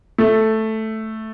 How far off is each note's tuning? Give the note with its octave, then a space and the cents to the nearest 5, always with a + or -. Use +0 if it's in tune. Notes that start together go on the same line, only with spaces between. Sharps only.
A3 +0